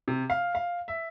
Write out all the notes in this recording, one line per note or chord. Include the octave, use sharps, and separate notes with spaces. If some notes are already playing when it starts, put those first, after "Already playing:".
C3
F5
F5
E5